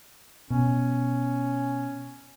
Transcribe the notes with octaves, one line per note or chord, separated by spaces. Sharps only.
B2 C#4